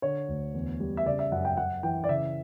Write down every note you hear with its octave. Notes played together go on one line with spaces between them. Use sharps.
D3 C#5
D2
E2
G3
E5
C#3 D5
E5
F#2 F#5
G5
F#2 F#5
E3 G5
D5
C#3 E5